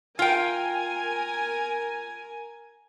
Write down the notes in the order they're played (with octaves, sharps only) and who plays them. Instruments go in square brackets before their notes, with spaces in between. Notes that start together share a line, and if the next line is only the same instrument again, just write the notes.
[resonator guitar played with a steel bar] F4 G5 [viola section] A#4 G#5